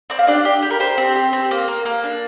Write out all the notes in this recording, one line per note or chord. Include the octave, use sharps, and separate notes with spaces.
C4 D5
F5
D4 G4 D5
G4
G4
A#4
G4 C5
C4
G4
C4
A#3
A#3
A#3
D4